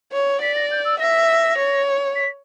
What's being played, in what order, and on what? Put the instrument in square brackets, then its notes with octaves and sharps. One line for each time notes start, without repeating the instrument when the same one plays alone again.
[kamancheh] C#5
[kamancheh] D5 [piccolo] B6
[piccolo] A#6
G6
E6
[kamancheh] E5 [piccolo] A#6
[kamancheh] C#5
[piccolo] B6